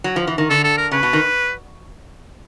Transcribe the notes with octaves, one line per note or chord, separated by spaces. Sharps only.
F#3
F3
E3
D#3
D3 A4
A4
A#4
C#3 B4
B2
D#3